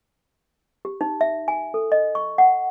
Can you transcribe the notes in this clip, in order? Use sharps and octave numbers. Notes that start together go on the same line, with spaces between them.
G4
D#4
E5
G#5
A4
D#5
C#6
F#5